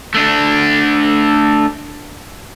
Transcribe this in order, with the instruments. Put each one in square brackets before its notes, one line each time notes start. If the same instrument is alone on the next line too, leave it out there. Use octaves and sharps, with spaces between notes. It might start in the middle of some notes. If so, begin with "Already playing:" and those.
[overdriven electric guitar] A3 D4